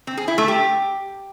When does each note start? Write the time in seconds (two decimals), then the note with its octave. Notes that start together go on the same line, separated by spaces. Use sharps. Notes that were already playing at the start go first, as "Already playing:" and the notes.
0.07 C4
0.17 G#4
0.28 E4
0.38 A3
0.48 G4